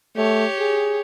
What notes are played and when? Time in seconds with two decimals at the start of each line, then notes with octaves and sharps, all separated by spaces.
0.17 A3 G4 C#5
0.59 G#4